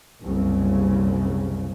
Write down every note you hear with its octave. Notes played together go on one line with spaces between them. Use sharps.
F#1 C2 C#3